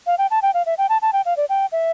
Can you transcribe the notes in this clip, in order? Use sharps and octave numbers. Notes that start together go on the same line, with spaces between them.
F5
G5
A5
G5
F5
E5
G5
A5
A5
G5
F5
D5
G5
E5